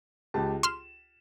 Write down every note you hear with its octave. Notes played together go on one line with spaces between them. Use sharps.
C#2 G4 A5
C6 F6 E7